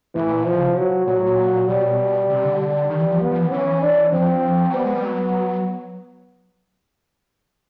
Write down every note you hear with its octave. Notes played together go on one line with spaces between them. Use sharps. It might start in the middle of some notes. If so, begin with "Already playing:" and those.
A2 E3
A#2
B2 F3
C#3
C3
F#3
A#2 F#3
A2
A#2
B2 G3
C3
D3
G3
D#3
E3
F3
B3
F3
E3
E3 C#4
D4
F3 C4
F#3
G3 B3
G#3
G3
F#3